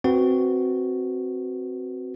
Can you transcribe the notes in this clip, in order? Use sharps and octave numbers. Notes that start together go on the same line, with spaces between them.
C4 F#4 B4